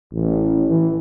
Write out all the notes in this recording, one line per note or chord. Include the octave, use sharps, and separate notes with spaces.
A1
E3